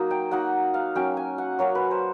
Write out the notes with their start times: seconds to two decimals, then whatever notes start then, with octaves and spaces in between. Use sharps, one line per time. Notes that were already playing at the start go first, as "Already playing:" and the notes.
Already playing: F#3 A#3 D#4
0.11 G5
0.31 F#3 A#3 D#4 F#5
0.74 F5
0.95 F#3 A#3 C#4 G5
1.17 G#5
1.38 F#5
1.59 F#3 A#3 C#4 C#5
1.75 B4
1.91 C5